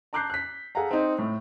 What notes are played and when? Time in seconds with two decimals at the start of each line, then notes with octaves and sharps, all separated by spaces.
0.13 A5 A#5 D6 F#6 G6 C7
0.30 F#6 B6
0.75 G#4 A4 F5 F#5 G#5 A#5
0.91 C4 D#4
1.18 A2